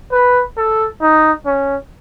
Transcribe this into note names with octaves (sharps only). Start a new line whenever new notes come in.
B4
A4
D#4
C#4